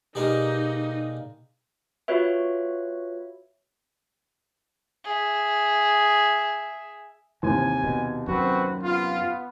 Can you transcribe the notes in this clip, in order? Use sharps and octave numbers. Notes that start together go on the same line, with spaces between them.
B2 G3 G#3 A#3 D#4
F4 F#4 B4 C#5 E5
G#4 E5
D#2 C3 E3 G#5
B2
F#2 C4 F#4 B4
B3 F4